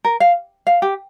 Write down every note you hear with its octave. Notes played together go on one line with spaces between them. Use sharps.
A#4
F5
F5
G4